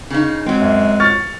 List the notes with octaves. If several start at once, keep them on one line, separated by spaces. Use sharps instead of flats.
C#3 D#4
F#3 G#3 C4
F#2
C#6 F6 A6